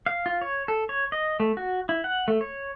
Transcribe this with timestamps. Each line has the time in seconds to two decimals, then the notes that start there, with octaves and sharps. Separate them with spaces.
0.06 F5
0.26 F4
0.41 C#5
0.68 A4
0.89 C#5
1.12 D#5
1.40 A3
1.57 F#4
1.89 E4
2.04 F#5
2.28 A3
2.41 C#5